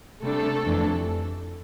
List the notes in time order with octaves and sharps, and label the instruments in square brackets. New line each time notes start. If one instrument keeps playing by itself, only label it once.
[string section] C3 G3 A3 D4 A4
F2 E3 A3 D4